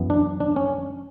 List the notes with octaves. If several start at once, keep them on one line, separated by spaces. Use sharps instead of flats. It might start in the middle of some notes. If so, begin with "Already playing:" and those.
Already playing: F#2 E3 B3
D4
D4
C#4